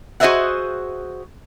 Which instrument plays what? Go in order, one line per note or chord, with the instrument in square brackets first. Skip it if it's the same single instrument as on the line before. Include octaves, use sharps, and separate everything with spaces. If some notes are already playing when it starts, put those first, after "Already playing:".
[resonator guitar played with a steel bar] F#4 G#4 C5 D#5 E5 F#5